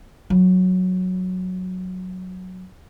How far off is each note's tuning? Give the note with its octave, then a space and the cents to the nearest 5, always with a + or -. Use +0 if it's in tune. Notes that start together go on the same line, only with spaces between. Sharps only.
F#3 -5